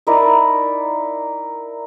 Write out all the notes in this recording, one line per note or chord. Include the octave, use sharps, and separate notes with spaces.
D#4 E4 A#4 D5